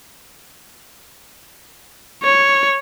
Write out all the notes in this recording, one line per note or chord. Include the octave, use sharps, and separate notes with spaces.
C#5